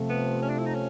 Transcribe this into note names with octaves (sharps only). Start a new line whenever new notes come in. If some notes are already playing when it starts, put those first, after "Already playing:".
Already playing: C3 F3 A3
B3
C#4
D4
E4
D#4
C#4